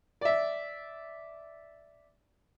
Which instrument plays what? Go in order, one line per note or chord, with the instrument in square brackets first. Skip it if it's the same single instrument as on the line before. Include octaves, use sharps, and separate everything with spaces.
[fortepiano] D5 E5